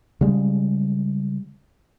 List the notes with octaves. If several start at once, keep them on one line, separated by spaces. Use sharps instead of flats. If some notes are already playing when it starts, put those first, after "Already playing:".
C#3 G3 G#3